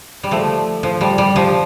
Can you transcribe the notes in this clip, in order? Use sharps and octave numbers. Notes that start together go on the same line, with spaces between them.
G3
F3 A3
F3
G3
G3
F3